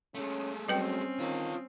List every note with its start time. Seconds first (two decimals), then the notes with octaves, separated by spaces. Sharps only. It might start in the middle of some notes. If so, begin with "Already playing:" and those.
0.15 G#3 A3 C#4
0.68 F#3 G3 C4 C#4 B4 G5
1.20 D#3 F4 C#5